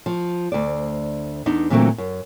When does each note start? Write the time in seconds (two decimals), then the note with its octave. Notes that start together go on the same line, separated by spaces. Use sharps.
0.06 F3
0.52 D2 C5 D5
1.46 E2 B3 D4 D#4
1.70 A#2 D3 E3 F#3 A3 C4
1.98 F#2